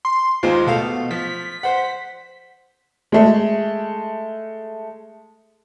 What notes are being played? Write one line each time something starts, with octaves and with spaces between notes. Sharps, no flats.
C6
D#2 G#3 F4 C5
B2 A3 A4 F5
F3 B6
C5 F#5
G#3 A3